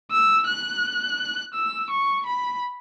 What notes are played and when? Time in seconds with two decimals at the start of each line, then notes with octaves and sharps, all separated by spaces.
0.11 E6
0.47 F#6
1.54 E6
1.90 C#6
2.26 B5